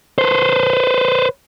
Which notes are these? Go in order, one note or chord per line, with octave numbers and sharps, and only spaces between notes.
B4 C5